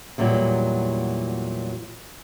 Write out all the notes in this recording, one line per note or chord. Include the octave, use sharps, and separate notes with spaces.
E2 A#2 F#3 G3